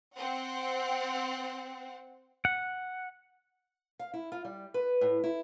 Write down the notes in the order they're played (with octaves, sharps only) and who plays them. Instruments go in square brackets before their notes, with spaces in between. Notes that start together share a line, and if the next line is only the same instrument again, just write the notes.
[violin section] C4 F#5
[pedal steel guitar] F#5
[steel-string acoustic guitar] F5
E4
F4
G3
B4
A2
E4